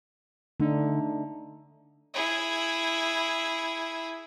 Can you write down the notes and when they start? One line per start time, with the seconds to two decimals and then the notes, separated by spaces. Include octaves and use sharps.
0.60 D3 A3 D4 D#4
2.14 E4 G#4